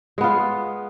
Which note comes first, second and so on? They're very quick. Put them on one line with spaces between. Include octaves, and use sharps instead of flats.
G#3 B3 F4